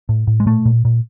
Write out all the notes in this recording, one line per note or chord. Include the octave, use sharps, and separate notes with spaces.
A2
A2
G#3
A#2 A3
A#2
A#2